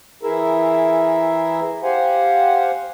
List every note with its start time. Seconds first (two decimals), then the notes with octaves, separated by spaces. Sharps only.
0.23 E3 E4 G#4 A#4 E5
1.83 G4 C5 F5 F#5 G#5